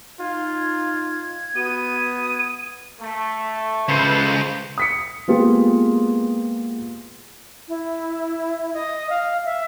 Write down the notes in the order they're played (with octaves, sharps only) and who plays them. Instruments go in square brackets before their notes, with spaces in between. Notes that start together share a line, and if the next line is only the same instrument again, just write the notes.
[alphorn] D#4 [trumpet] F4 [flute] G#6
[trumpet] B3 [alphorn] F#4 [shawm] D#6
[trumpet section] A3
[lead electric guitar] C#2 C#3 [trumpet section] A4 B4 [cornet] C5
[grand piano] D#6 B6 C#7
G#3 A#3 B3 F4 G4 G#4
[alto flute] E4
D#5
F5
E5